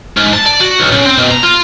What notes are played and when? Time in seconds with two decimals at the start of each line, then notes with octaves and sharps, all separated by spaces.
0.17 G#2
0.33 A5
0.46 D5
0.61 F#4
0.79 B1
0.92 C#3
1.06 C4
1.18 B2
1.31 A#5
1.43 F4